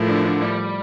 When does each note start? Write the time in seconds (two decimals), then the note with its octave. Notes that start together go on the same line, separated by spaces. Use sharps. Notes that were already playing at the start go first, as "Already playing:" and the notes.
Already playing: A2 F3 A3 E4 A#4
0.08 D3
0.25 D3
0.41 G3